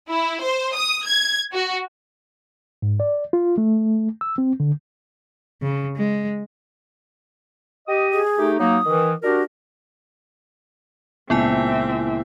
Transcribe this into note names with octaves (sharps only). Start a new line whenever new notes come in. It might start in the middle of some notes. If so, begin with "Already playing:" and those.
E4
C5
D#6
G#6
F#4
G#2
D5
F4
A3
E6
C4
D3
C#3
G#3
G4 D#5 D#6
G#4
A3 D#4 G4
F#3 A#3 D#4 D#6
D#3 E3
D4 F#4 G4 A#4
C#2 A#2 B3 C4 E4 E5 G#5